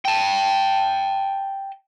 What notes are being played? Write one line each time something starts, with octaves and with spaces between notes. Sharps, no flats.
G5 A5